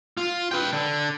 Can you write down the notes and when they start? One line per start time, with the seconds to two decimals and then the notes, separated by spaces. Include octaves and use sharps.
0.17 F4
0.51 B4 G5
0.73 D3